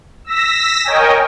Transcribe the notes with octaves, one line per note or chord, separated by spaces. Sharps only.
E6 A#6 B6
A#4 C#5 D#5 G5 G#5